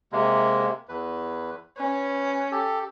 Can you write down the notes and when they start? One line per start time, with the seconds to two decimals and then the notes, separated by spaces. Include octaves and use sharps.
0.12 C3 G#3 A#3
0.89 E2 B4
1.77 C#4 B4
2.52 G4 A4